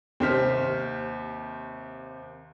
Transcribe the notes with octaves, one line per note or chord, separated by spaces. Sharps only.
D#2 C3 C5 F6 B6